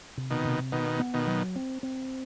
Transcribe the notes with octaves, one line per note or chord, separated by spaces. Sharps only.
C3
B2 D#3
C3
B2 D#3 B3
B3
B2 D#3
F#3
C4
C4